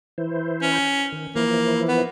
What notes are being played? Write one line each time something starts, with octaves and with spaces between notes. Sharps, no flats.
E3 E4 C5
C#4
D#3
E3 F3 A#3 E4
B3